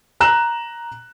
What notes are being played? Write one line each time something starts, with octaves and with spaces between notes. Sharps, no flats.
A#5 F#6 E7